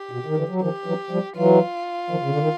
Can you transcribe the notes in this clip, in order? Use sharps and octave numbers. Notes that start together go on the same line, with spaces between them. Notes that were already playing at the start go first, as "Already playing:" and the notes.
Already playing: G4
B2
D#3
D3 E3
F#3
D#3 F3 G4
E3 F#3
F3 G3
E3 F#3 F4
D#3 F3
C#3
D3
D#3